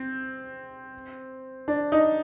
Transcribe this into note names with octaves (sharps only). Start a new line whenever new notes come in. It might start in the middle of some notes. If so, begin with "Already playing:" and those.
Already playing: C4
D4
D#4